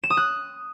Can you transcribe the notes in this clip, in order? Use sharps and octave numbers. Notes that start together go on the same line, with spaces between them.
E7
D#6
F#6